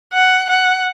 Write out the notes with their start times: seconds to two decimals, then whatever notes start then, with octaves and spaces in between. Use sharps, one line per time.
0.14 F#5
0.50 F#5